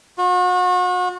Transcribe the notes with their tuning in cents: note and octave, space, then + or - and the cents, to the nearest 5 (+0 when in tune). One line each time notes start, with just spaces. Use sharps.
F#4 -40